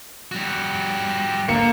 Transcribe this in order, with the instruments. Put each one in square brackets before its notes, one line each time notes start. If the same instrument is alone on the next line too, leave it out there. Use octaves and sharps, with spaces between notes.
[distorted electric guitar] G3 F#4
[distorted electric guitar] D3 [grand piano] A#3 C#7